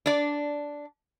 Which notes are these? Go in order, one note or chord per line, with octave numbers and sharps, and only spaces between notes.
D4 D5